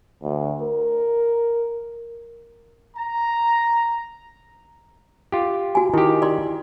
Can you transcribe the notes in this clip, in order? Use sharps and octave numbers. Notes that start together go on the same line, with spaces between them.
D2
A#4
A#5
F4 G4
F#4 G#5
D#3 E4 G4
D5 C6